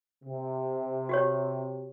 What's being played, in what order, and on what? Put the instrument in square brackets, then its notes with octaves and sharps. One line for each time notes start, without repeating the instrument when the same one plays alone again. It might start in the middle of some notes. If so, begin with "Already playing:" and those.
[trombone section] C3
[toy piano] F#4 G4 C#5